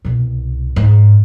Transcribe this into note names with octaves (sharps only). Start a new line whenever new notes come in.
C2 B2
G#2